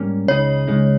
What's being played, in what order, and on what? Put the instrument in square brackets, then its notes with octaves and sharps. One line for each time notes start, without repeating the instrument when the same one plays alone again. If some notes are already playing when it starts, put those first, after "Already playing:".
Already playing: [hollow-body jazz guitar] G#2 G3 A#3 C#4
[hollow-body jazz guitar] C#2 C#3 G#3 D#4 [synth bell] C#5
[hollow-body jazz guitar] C#2 C#3 G#3 D#4